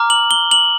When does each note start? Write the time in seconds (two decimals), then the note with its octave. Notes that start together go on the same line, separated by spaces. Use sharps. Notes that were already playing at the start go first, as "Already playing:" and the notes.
Already playing: A#5 D6 F6
0.10 F#7
0.31 G7
0.51 F#7